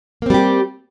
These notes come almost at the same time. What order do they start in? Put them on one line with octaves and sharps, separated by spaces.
A#3 C4 G3 G4